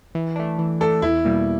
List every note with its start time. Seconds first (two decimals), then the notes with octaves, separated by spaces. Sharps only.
0.15 E3
0.36 A3 D4
0.59 E3
0.81 A3 D4 A4
1.02 E2 E4
1.25 B2 G3 A#3